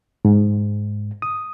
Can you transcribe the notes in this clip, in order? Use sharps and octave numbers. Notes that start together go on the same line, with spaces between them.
G#2
D#6